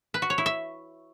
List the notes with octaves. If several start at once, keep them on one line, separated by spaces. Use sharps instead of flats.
B4
F#4
C#5
E4
E5